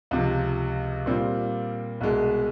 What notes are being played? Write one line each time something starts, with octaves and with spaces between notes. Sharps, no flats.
C#2 C3 F3
A#2 G3 C4 F4
C2 B2 G#3